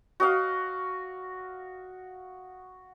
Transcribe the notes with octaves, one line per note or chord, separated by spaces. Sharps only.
F#4 D#5 F5